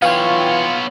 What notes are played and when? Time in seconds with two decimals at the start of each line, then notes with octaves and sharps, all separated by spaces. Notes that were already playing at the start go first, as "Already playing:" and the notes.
0.02 E3 B3 F4 C#5 F5 G5